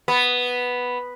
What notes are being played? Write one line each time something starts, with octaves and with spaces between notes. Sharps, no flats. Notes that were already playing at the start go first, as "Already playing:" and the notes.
B3